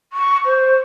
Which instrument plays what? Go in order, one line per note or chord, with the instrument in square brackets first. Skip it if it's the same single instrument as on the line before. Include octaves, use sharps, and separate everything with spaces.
[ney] C#6
C5